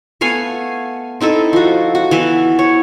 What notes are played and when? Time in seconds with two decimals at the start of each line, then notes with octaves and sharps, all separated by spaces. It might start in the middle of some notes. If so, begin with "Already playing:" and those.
0.21 A3 B3 F5 G#5
1.20 C4 D#4 E4 A4
1.53 F3 F#4
1.95 F#4
2.11 E3 B3 E5
2.59 C#5